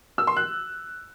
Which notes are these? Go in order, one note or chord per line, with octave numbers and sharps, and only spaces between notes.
E6
C6
F#6